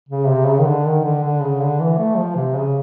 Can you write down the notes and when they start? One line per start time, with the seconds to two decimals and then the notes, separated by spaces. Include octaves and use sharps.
0.09 C#3
0.27 C3
0.47 C#3
0.59 D#3
0.65 D3
0.85 D#3
1.04 D3
1.23 D3
1.41 C#3
1.60 D3
1.79 E3
1.98 A3
2.17 F3
2.36 C3
2.56 C#3